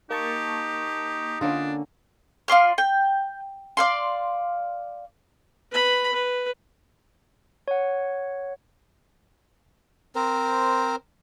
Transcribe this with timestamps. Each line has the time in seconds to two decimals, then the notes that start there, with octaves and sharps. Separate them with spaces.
0.11 A#3 D#4 G4 A5 C#6
1.41 D3 A#3 C#4 D4 F4
2.48 F4 D5 C6 F6
2.78 G5
3.77 D5 F5 C6
5.71 B4 B5
6.13 B4
7.68 C#5 F#5
10.15 C4 A#4 C5